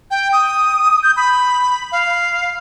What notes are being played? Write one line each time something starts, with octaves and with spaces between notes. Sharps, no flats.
G5
D#6
G6
B5
F5